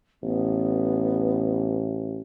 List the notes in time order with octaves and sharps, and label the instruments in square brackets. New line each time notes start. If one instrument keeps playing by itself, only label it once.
[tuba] A1 [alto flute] B3